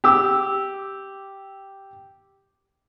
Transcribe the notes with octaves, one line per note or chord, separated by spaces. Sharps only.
G4 D6 E6